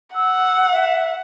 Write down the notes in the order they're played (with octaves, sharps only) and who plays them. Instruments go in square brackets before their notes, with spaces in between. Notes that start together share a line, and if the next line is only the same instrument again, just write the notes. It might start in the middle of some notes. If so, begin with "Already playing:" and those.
[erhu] F#5 [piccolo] E6
[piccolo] E5